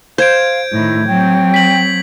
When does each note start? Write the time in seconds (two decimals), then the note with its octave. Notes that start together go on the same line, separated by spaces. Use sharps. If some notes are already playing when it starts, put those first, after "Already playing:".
0.18 C5 F5 G6 G#6 D7
0.72 A2 D#3 E4
1.07 F#3 C4 G5
1.54 B6 F#7